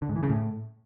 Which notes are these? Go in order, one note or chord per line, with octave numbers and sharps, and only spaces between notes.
D3
G#2
E3
C#3
A2